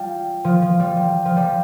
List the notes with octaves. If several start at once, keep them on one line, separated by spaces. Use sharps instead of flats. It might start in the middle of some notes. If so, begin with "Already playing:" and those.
Already playing: G3 F4
F3
F3
G3
G3
F3
G3